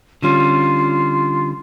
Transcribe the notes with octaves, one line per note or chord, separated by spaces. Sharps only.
D3 G3 C#4 F4